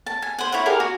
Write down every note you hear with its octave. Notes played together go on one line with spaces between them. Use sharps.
A5
G#5
C5 F#5
E4 C#5 E5 F#5
G4 G#4 A#4 D5
F#4